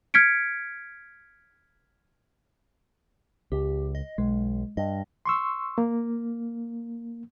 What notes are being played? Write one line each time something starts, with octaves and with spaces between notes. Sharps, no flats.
F6 G#6 B6 C#7 D7
C#2 G4
D#5
B1 G#3
G2 D#5
C6 C#6 E6
A#3